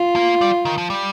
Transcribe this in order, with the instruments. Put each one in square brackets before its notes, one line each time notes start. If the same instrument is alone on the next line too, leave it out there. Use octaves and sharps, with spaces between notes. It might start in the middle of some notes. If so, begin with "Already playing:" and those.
Already playing: [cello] F4
[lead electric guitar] A#3
G3
D#3
F3
G3